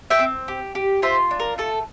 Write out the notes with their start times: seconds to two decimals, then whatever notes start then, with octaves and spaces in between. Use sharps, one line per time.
0.10 E5 G5
0.19 C4
0.48 G4
0.75 G4
1.02 F4 C5 E5
1.31 D4
1.40 A#4
1.58 A3 A4